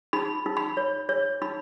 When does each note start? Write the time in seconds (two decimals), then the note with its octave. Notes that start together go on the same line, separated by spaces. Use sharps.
0.13 D#4 B5
0.46 D#4
0.57 B5
0.77 C#5
1.09 C#5
1.42 D#4 B5